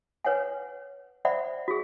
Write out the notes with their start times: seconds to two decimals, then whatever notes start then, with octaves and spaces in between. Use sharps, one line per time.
0.25 B4 C#5 F#5 G#5
1.25 C5 D5 E5 F#5 B5
1.68 F#4 G#4